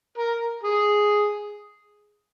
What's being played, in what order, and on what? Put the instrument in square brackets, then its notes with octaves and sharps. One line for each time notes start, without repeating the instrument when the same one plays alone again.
[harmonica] A#4
G#4